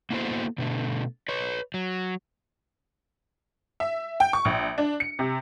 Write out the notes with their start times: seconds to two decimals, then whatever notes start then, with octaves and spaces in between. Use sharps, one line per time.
0.10 A#3 B3 E4 F#4 A4 C5
0.58 B2 D3 A3
1.29 B4 C#5
1.74 F#3
3.80 E5
4.20 G5
4.33 C#6
4.45 A#1
4.78 D4
5.00 C#7
5.19 C3